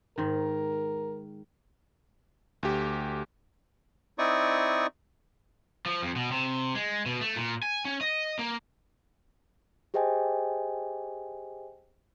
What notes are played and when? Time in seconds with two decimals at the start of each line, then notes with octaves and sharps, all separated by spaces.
0.18 G#2 D#3 A#4
2.63 D2 G4
4.18 C4 D#4 E4 D5 C#6 D#6
5.86 F3
6.02 F2
6.16 B2
6.31 C3
6.75 G#3
7.06 B2
7.21 A3
7.36 A#2
7.62 G#5
7.85 C#4
8.01 D#5
8.39 A#3
9.94 G4 G#4 C5 D#5 G5 G#5